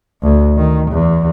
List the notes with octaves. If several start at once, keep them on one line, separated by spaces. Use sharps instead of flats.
D2
D#3
E2